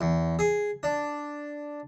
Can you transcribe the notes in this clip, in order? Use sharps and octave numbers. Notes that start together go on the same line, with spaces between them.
E2
G#4
D4